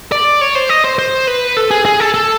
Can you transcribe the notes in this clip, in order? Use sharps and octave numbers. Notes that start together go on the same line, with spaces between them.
D5
C#5
C5
D#5
C5
C5
B4
A4
G#4
G#4
A4
A4